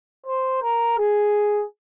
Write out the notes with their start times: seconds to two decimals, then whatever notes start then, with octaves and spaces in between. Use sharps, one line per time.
0.27 C5
0.63 A#4
0.99 G#4